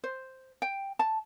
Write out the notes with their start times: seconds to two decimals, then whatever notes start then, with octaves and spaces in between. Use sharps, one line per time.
0.04 C5
0.62 G5
0.99 A5